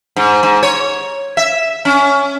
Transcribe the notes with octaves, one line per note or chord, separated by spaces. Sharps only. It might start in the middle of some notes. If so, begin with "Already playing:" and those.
G#2
G#2
C#5
E5
C#4